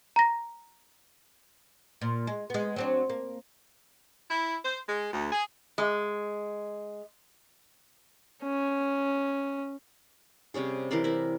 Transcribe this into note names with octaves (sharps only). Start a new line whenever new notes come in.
A#5 A#6
A#2
G#3
G#3 B3
F#3 C4 D4
A#3
E4
C5
G#3
D2
G#4
G#3
C#4
C3 G3 C#4 G#4
E3 A#4 C5 D5
E4 A#4